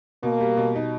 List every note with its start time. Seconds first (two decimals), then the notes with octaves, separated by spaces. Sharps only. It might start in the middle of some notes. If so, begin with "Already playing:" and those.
0.23 B2 A#3
0.40 G3
0.57 B2
0.76 D#4